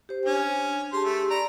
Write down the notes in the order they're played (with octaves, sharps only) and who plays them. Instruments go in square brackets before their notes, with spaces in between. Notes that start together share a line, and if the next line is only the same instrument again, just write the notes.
[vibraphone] G4 C5
[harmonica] C#4 G#5 [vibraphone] D4
[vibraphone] G4 G#4 A5 [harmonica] C6
[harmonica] A3
[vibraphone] D5 B5 [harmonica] A#5